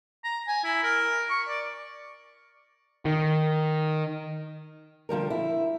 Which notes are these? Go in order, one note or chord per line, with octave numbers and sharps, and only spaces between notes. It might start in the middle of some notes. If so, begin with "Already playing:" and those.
A#5
G#5
E4
A#4
C#6
D5
D#3
D3 F3 G3 A#4
E4